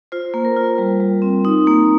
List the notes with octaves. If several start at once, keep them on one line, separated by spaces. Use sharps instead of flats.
F4 C5
A#3
A#4
F4
G3
G3
C4
D#4
A#3